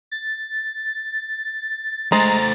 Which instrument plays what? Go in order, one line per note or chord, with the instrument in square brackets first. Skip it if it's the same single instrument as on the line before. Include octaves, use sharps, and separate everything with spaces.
[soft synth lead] A6
[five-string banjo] G#3 [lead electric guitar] A3 C5 [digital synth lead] A#5 [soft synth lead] A6